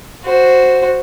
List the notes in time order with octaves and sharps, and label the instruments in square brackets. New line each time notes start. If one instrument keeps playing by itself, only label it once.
[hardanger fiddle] F#4 C5